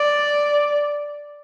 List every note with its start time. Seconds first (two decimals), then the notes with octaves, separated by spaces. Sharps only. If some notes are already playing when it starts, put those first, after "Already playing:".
Already playing: D5